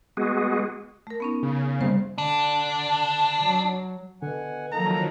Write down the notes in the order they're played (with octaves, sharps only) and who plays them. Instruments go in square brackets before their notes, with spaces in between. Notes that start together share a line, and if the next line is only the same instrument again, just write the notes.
[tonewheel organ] G#3 B3 F#4 G#4
[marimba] A3 A#4
B3 C#4 D#4
[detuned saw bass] C#3
[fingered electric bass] G3 G#3 B3 [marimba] C5
[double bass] D3 [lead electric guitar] D4
[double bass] F#3
[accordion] B2 F#5 G#5 [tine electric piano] D3
[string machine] D#3 F3 F#3 [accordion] A#3 D#4 A4 [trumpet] A#5